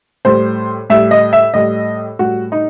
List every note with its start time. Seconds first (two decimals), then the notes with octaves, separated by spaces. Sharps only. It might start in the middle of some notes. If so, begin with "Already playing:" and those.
0.25 A2 G3 C5
0.90 A2 G3 E5
1.11 D#5
1.33 E5
1.54 A2 G3 D#5
2.19 A2 G3 F#4
2.52 D#4